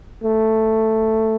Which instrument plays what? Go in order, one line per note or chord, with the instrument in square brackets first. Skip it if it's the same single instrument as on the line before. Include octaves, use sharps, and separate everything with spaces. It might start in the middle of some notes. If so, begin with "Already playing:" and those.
[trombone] A3